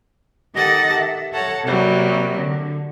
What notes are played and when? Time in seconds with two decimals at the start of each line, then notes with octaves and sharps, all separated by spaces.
0.56 D#3 G4 A4 D#5 F#5 A6
0.98 E5
1.33 A4 C#5 F#5 A5 A#5
1.65 C3 F#3 G3 A#3
2.37 D3